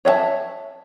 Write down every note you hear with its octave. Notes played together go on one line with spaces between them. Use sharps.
C#5 E5 F#5 A5